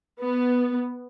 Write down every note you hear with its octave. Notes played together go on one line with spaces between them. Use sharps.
B3